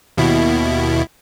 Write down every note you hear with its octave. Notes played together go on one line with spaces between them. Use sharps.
D#2 B2 E4